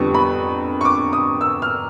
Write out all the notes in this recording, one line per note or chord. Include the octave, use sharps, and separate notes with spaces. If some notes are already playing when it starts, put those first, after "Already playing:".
Already playing: F2 D3 G3 B3 C#6
B5
C#6
D6
D#6
E6
F6